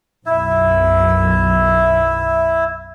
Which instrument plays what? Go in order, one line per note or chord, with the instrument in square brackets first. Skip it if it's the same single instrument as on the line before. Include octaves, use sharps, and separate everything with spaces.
[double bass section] B1 F#2 [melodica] E4 E5